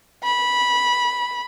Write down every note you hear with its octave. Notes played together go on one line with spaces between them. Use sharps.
B5